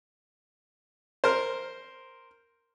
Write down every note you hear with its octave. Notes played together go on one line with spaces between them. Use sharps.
A#4 C5